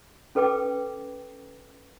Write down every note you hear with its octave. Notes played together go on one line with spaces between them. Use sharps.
C#4 A4 B4 G5 D6